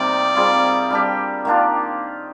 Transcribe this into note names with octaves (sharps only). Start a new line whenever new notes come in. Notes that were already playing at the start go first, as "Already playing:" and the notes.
Already playing: C3 G3 A#3 C4 D#4 D5
G3 C4 F4 G#4
G3 D4 G4
D#3 A#3 D4 F4